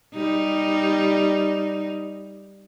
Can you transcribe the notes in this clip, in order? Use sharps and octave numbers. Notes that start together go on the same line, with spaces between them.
G3 D#4